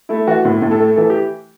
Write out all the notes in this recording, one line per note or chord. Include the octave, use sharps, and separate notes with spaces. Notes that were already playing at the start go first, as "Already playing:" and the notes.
A3 E4
E3 F#4
A2
A2
A4
A3
E3 A4
G4